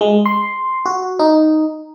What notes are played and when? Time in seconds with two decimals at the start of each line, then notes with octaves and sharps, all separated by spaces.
0.01 G#3
0.26 C6
0.85 F#4
1.19 D#4